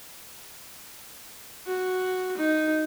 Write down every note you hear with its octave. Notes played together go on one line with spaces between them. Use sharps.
F#4
D#4